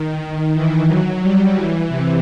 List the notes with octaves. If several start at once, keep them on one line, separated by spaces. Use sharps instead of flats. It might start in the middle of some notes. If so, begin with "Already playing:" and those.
Already playing: D#3
E3
F#3
G3
E3
C3